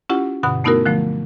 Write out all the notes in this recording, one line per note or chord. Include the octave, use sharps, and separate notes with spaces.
C#4 E4 F4 G4 F#5
G2 B2 D3 F#5
A3 B3 D#4 E4 F#4 A#4
D3 F3 F#3 A3